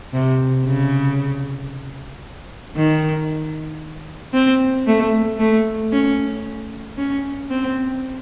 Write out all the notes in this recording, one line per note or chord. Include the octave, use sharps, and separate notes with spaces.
C3
C#3
D#3
C4
A3
A3
C#4
C#4
C4